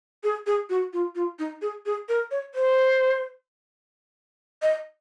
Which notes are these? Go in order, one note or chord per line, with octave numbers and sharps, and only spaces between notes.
G#4
G#4
F#4
F4
F4
D#4
G#4
G#4
A#4
C#5
C5
D#5